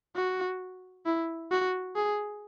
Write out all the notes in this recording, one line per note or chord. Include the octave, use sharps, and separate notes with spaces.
F#4
E4
F#4
G#4